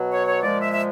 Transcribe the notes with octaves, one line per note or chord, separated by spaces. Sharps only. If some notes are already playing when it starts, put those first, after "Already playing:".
Already playing: B2 F#3
C#5
C#5
A#2 F3 G#3 D5
E5
E5